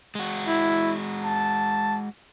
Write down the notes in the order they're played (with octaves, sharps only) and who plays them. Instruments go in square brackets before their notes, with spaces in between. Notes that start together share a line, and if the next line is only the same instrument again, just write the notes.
[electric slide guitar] G#3 F#4
[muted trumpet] E4
A5